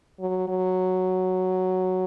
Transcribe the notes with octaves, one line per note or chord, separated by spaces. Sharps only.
F#3
F#3